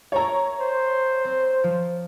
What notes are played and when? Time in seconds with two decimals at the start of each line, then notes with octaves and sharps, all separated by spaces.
0.12 A4 A#4 C#5 E5 A#5
0.61 C5
1.25 C4
1.64 F3